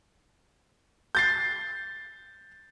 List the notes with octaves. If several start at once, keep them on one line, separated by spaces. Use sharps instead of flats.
G6 A6 C7